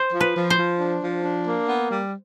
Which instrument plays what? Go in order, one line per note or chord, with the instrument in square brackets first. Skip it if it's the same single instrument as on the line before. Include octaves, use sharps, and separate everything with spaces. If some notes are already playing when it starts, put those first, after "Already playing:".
Already playing: [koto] C5
[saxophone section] F3
[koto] B4
[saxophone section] F3
[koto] C5
[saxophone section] F3
D4
F3
D4
A#3
B3
G3